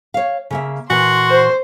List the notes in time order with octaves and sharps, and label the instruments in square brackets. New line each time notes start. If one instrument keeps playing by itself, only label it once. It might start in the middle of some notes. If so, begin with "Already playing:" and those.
[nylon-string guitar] C#5 F5
C#3 A#3 E5
[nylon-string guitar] A#2 E3 [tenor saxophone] F#4 [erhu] C6
[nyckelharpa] C5